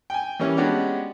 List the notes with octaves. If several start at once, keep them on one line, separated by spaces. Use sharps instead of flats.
G5 G#5
E3 G3 A#3 C#4
G#3 B3 C#4 D4 F#4 G4